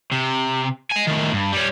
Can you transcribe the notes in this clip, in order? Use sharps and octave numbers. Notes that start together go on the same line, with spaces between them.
C3
D#5 G#5
A2 D#3
G2
G3 C#4